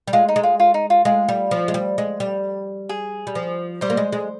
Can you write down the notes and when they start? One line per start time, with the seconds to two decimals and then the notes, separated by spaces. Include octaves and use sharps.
0.08 G3
0.13 G#3 F4
0.28 D#4
0.36 G#3
0.43 F4
0.60 F4
0.74 D#4
0.90 F4
1.05 G#3 F4
1.29 G3
1.51 F3
1.68 G#3
1.74 G3
1.98 G#3
2.20 G3
2.89 G#4
3.27 G3
3.35 F3
3.81 G3 C5
3.90 A#3
3.97 G#3
4.12 G#3